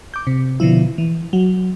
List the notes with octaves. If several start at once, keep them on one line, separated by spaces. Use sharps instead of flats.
D6 G6
C3
B2 D3 F3 E4
E3
F#3